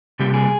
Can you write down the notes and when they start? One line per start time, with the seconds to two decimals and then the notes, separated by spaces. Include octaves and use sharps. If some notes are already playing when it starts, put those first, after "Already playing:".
0.19 C3 G3 A#3 G4
0.34 G#4